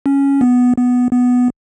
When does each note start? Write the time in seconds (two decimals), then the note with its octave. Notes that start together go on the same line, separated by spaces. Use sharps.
0.06 C#4
0.41 B3
0.77 B3
1.12 B3